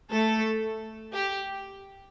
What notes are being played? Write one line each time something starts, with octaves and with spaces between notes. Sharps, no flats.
A3 A4
G4